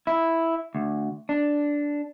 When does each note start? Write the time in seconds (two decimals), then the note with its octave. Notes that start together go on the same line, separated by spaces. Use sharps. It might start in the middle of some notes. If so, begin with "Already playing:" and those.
0.07 E4
0.75 D2
1.29 D4